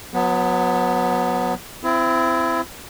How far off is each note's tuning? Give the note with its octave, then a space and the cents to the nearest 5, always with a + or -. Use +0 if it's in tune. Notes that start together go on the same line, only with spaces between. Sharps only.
F#3 -30 B3 +0
C4 -15 E4 +30